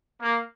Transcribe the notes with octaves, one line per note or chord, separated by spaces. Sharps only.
A#3